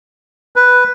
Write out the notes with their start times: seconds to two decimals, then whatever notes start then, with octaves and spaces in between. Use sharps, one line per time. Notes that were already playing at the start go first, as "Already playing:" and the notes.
0.56 B4